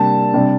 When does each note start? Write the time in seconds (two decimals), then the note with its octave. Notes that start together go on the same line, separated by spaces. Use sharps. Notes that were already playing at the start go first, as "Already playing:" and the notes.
Already playing: C3 G3 A#3 D4 A5
0.34 C3 G3 D4